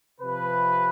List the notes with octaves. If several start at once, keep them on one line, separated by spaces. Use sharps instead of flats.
C3 F3 B4